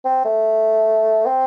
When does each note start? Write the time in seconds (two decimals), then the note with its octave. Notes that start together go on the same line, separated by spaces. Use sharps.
0.05 C4
0.25 A3
1.26 C4